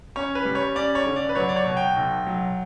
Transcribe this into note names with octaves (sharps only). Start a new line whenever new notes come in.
C#4 C#5
B4
G3
C#5
C#4 D5
C#5
D3
D5
B4
F#3 C#5
D5
C#5
B2
G5
B1
F#3